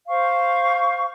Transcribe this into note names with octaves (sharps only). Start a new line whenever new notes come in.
C5 F5 C#6